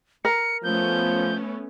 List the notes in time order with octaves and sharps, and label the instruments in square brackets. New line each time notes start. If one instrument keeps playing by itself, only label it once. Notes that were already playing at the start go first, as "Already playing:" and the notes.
[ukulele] A#4 [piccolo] C#7
[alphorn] F3 [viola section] A3 B3 C#4 [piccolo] G6